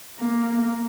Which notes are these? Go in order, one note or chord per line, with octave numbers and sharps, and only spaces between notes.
A#3